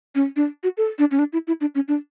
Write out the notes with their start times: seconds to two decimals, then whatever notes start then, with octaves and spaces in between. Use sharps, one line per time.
0.15 C#4
0.36 D4
0.64 F#4
0.77 A4
0.99 D4
1.11 C#4
1.19 D4
1.33 E4
1.47 E4
1.61 D4
1.75 C#4
1.88 D4